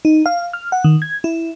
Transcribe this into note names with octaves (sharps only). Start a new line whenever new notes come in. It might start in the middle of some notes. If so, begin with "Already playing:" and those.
D#4
F5
F6
F#5
D#3
G#6
E4